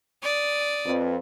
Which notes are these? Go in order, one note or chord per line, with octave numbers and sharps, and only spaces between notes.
D5 D#6
F2 C4 B4